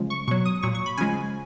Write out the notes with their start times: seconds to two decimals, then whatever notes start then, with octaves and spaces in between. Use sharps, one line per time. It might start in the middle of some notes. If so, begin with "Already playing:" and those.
Already playing: C#3 F3 G#3
0.10 C#6
0.28 B2 C#6
0.31 F#3
0.45 D#6
0.63 A#2 F#3 C#6
0.75 C#6
0.86 B5
0.97 C#3 F3 G#3 G#5